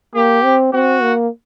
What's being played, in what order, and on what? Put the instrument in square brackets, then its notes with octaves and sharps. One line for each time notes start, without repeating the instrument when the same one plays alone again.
[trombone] A#3 [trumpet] G4
[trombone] C4
[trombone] C4 [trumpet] F#4
[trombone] A#3